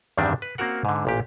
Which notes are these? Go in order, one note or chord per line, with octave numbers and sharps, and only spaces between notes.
E2 G2 D#3 G3 C4 D4
B4
A#3 C4 C#4 F#4 A#4 F#5
G#2 D3
A1 A#2 G4